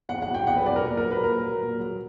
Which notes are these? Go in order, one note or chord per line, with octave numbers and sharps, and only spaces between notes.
E2 F#5
F#5
B2 F#3
G5
E2 F#5
B4
B2 F#3 D5
A#4
A#2
A#4
F#3
B4
A#2 A#4
F#3
A#2
F#3